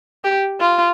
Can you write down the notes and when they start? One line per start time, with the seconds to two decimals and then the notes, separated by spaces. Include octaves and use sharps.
0.24 G4
0.61 F4